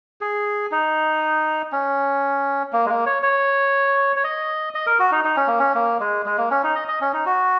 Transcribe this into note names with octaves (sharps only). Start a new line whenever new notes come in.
G#4
D#4
C#4
A#3
G#3
A#3
C#5
C#5
C#5
D#5
D#5
A#4
F#4
D#4
D#4
C#4
A#3
C#4
A#3
G#3
G#3
A#3
C#4
D#4
D#5
D#5
C#4
D#4
F#4